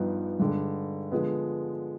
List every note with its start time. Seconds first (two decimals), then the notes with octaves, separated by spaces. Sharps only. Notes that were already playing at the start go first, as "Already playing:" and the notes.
Already playing: G2 F3 B3 D#4
0.39 G2 D3 G#3
1.12 D3 F3 G#3 B3